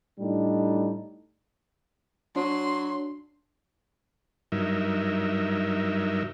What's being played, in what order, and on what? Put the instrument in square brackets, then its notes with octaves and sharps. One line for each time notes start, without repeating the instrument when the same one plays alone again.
[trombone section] A2 G3 D4 D#4
[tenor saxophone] F#3 [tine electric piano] D4 [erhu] C6
[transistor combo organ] G2 F#3 D#4 A#4 E5